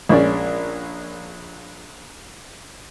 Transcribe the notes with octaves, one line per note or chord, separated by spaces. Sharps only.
A#1 G#3 C#4 D5